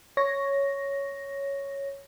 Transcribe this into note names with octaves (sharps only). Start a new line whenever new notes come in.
C#5 A#6